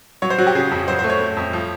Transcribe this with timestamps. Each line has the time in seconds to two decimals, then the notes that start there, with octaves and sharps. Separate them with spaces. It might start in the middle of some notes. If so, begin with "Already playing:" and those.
0.22 F#3 C#5
0.30 C5
0.38 F#3 F#4
0.47 G4
0.55 C#3 G#4
0.71 F2
0.88 F#3 C5
0.99 C5
1.04 A3
1.10 C#5
1.21 A3
1.37 F2
1.53 F3